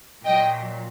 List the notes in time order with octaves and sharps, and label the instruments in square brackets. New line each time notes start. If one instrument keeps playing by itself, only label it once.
[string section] A#2 F#3 D#5 G5